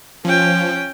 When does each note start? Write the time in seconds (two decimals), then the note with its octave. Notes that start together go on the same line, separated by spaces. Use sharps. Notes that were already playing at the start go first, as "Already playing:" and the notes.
0.25 F3 C#4 G5